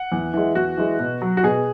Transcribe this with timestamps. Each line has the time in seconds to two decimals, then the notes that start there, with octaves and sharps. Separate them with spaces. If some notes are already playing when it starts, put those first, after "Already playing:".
Already playing: F#5
0.12 E2
0.34 E3 G#3
0.55 E2 F#4
0.77 E3 G#3
1.00 B2
1.22 F#3
1.37 F#4
1.43 B2 G#4